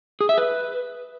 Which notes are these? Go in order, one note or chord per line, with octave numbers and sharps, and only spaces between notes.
G#4
E5
B4